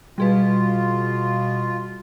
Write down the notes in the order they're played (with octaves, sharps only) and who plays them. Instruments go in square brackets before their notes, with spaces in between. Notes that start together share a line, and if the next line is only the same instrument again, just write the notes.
[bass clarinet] B2 [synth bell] G3 G#4 B4 [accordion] F4